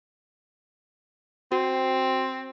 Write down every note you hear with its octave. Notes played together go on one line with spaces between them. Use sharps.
C4 F#4